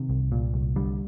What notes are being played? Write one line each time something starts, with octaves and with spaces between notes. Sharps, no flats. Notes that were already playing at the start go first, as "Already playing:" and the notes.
Already playing: C3 D#3
C2
A#2
C2
D3 G3